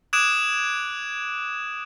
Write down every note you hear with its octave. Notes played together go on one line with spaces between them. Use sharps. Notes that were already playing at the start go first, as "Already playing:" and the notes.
D6 D#6 F#6 G#6 D7 E7